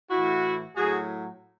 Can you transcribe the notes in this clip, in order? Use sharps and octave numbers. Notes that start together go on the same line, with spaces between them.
A2 E3 E4 F#4
A2 F#3 F#4 G#4